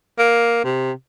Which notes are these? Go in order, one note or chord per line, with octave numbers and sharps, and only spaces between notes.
A#3
C3